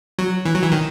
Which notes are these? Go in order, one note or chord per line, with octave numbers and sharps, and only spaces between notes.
F#3
E3
F#3
E3
D#3